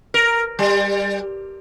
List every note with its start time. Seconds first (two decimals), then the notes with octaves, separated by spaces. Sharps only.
0.14 A#4
0.59 G3